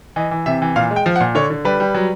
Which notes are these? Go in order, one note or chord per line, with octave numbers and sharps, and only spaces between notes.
E3 D#5
E3
C3 E5
E3
A#2 F5
G#3
G5
F3
F#5
A#2
D3 C#5
D3
G3 B4
G3
F#3